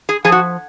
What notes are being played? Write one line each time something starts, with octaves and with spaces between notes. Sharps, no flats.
G#4
F3 G#4
F#4